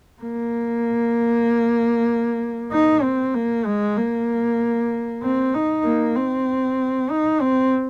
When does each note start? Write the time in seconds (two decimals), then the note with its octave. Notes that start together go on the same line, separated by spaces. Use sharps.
0.22 A#3
2.72 D#4
3.03 C4
3.35 A#3
3.66 G#3
3.98 A#3
5.23 C4
5.54 D#4
5.85 A#3
6.17 C4
7.11 D#4
7.41 C4